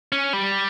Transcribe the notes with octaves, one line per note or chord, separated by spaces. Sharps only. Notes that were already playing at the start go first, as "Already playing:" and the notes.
C#4
G3